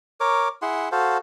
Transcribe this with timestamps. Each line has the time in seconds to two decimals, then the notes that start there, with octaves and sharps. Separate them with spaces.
0.20 A#4 C#5 D6
0.62 E4 G#4 F#5 C6
0.92 F#4 A4 C5 F5